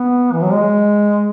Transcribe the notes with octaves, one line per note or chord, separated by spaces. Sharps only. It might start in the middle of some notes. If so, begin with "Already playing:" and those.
Already playing: B3
E3
F#3
G#3